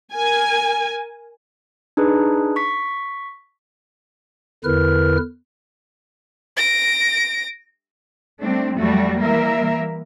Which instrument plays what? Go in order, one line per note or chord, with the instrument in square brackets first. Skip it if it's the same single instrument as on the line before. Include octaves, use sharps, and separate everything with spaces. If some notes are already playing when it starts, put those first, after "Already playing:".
[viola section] A#4 G#5
[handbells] D4 D#4 G#4 B4
C#6 B6
[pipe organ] E2 D3 E4 A#4 B4 F6
[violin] A#6 D7
[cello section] G3 A3 C4 D4
F2 F#3 G3 A3 F#4
E3 G3 A#3 A#4 E5